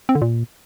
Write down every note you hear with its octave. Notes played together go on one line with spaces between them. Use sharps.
C4
D3
A#2